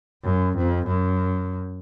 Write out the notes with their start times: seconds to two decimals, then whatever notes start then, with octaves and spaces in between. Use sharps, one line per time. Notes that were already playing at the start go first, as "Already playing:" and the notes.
0.24 F#2
0.57 F2
0.87 F#2